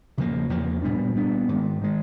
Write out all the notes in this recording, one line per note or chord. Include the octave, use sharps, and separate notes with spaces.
E2 C#3 F3 A#3
E2 C#3 F3 A#3
A#2 G3 B3 D4
A#2 G3 B3 D4
G#2 D#3 G#3
D#3 G#3